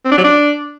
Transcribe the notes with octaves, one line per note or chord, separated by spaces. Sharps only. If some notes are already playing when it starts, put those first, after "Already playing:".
C4
D4
F#3
D4